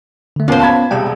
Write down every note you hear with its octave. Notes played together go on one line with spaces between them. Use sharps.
D3 A3
D#2 A#3 B3 C#4 F4 C5
A5 B5 G#6
E1 C2 G4 G5